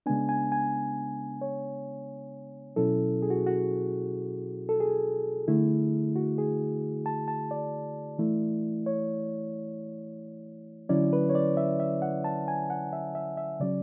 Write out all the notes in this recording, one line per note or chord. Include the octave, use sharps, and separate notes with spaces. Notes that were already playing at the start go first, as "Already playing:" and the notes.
C#3 G#3 B3 D4 G#5
G#5
G#5
C#5
B2 F#3 C#4 E4 A4
G#4
F#4
F#4
A4
G#4
D3 A3 E4
F#4
G#4
A5
A5
D5
E3 A3 E4
C#5
D3 F#3 C#4 E4 D5
B4
C#5
D5
E5
E5
F#5
A5
G#5
F#5
E5
E5
E5
C#3 F#3 C#4 D5